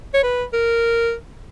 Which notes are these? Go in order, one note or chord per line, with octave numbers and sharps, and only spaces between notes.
C#5
B4
A#4